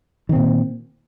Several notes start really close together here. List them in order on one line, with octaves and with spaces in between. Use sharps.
D#3 C4 A#2